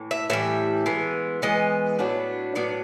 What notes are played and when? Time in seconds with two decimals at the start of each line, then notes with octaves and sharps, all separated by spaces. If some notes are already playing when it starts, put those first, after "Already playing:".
Already playing: A2 E3
0.11 E5
0.30 A2 E3 G3 E5
0.86 E3 G#3 B3
1.42 E3 G#3 B3 D#5
1.99 A2 F#3 B3 D4
2.55 A2 F#3 B3 D5